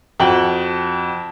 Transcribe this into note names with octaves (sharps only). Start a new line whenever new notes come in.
F2 F#4 G5 A5 F#7